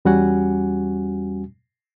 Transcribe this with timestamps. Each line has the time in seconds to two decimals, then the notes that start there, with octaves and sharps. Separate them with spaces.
0.05 E2 G3 C#4 F#4 F#5 G#5